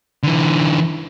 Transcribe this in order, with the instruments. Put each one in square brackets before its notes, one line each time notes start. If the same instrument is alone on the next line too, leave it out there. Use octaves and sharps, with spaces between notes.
[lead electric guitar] D3 E3